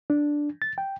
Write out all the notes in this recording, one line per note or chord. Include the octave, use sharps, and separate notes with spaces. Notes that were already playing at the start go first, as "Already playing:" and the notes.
D4
A6
G5